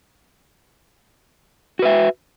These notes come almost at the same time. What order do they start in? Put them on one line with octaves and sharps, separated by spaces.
F#4 B4 E5